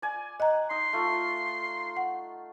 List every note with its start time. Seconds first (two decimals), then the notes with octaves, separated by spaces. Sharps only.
0.02 D5 G#5
0.40 D#5 F#5 A#5
0.70 D#4 C6
0.93 A3 F4
1.97 F#5